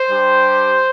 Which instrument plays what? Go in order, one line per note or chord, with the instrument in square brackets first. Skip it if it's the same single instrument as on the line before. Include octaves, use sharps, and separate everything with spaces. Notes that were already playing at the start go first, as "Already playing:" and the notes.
Already playing: [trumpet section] C5
G3 D4 G4